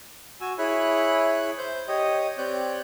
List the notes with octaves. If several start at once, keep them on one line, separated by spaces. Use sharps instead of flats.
F#4 G#5 E6
E4 G#4 C#5 B5 F#6
C5 G6
G4 C#5 D#5 D#6
C4 G4 C#5 D5 F#6 G6